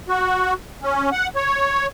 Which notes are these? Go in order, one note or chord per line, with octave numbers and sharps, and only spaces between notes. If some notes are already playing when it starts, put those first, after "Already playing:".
F#4
C#4
F#5
C#5